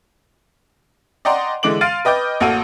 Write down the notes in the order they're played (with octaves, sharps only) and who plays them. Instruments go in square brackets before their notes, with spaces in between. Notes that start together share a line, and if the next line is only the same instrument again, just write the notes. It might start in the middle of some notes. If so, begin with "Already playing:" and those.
[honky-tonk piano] D5 D#5 F#5 G5 A#5 C6
D3 E3 G#3 D6 D7 F#7
F5 C6 F6 A6 D7 D#7
B4 D#5 G5 D6 G6
A1 A#3 F#4 A4 E6 D#7